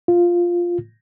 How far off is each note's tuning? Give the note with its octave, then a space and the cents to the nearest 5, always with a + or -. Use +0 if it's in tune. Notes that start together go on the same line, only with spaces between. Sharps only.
F4 +0